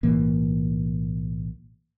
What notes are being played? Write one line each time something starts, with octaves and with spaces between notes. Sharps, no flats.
B1 A2 E3 A#3